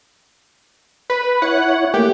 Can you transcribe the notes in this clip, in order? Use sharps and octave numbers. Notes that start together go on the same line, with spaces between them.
B4
E4 C#5 F#5
A3 A#3 G4